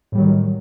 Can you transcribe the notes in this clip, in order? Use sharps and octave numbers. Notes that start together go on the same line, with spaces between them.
A2 D#3 F#3 G3